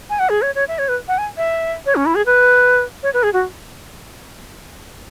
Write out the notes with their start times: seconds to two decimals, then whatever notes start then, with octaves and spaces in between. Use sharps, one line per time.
0.10 G#5
0.19 F#5
0.29 G#4
0.42 C#5
0.55 C#5
0.68 E5
0.78 C#5
0.88 B4
1.08 F#5
1.18 G#5
1.37 E5
1.86 C#5
1.95 C#4
2.06 E4
2.15 G#4
2.26 B4
3.03 C#5
3.14 B4
3.23 G#4
3.33 F#4